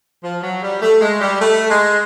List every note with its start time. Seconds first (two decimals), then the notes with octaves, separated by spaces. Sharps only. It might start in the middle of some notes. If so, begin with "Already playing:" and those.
0.23 F3
0.43 F#3
0.62 G3
0.82 A3
1.01 G#3
1.21 G3
1.41 A3
1.70 G#3